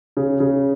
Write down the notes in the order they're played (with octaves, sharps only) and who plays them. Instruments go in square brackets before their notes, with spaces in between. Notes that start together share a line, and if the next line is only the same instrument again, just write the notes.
[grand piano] C#3
C#3